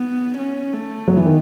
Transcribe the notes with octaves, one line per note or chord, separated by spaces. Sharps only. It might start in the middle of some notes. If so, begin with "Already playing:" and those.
Already playing: B3
C#4
A3
F#3 B3
E3
D#3